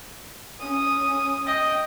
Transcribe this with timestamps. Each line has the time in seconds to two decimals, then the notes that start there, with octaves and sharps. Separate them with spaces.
0.60 C#4 D#6
1.47 D#5 G5